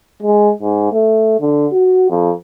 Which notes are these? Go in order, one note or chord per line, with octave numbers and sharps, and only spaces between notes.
G#3
G#2
A3
D3
F#4
F2